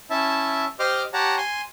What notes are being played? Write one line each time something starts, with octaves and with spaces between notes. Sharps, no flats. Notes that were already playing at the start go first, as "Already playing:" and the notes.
C#4 E4 E5 A5
G4 C5 D#5 C6 D6 F6
G4 C#5 F#5 A5 A#5
G#5 C6